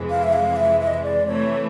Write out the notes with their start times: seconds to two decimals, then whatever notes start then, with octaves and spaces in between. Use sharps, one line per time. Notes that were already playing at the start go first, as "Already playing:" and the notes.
Already playing: F2 C3 E3 G#3
0.10 F5
0.23 E5
0.33 F5
0.56 E5
0.81 E5
0.87 D#5
0.94 E5
1.03 D5
1.27 C3 E3 A3 C#5